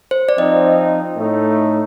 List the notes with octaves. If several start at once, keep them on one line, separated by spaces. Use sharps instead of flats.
C5
D5
F3 C4 D#4 D#5
A2 A3 D#4